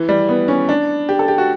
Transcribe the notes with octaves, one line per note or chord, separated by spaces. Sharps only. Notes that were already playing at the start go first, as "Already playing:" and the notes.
Already playing: E3
G3
B3
C#4
D4
G4
A4
G4
F#4